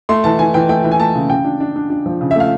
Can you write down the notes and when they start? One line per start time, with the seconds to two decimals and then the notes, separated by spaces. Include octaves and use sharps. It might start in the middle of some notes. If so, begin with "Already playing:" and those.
0.09 A3 C6
0.24 E3 A5
0.39 E3 G#5
0.54 E3 G5
0.69 A3 G5
0.84 E3
0.91 G#5
1.00 A3 A5
1.15 C#3
1.30 C#3 G5
1.44 D4
1.60 D4
1.76 D4
1.90 D4
2.06 F3
2.21 C#3
2.31 E5
2.36 A3 F5